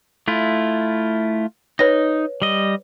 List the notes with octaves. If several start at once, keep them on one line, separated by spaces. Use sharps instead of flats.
A3 E4 F4
D#4 B4 C#5 A#6
G3 D#5